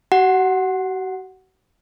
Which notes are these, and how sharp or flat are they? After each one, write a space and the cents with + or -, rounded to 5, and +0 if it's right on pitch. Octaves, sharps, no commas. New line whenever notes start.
F#4 +40 F#5 +0